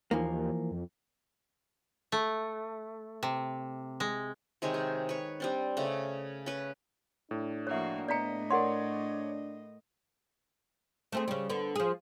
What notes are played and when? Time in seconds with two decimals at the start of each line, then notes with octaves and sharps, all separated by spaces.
0.11 D#2 E3 F3 A#3
0.71 F2
2.12 A3
3.23 C3
4.00 G#3
4.62 C3 D#3 G#3 C#5
4.74 G#4
5.09 B4 C#5
5.40 G3 C4 D4
5.77 C#3 A3
6.46 C#4 B4
7.31 A2 D4
7.67 F3 A#3 F#4 C#5 E5
8.08 A2 B3 D5 D#5 A#5 B6 C#7
8.50 A#4 C#5 D5 F#5 C6
11.12 A3 C4 G#4
11.28 C#3 G3
11.50 D3 B3
11.76 F3 G#4